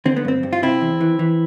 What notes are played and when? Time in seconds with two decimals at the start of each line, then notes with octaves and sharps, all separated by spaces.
0.05 D3 C4
0.16 B3
0.25 G2 C4
0.43 G2
0.53 F4
0.63 C3 C4 E4
0.81 E2
1.01 E3
1.19 E3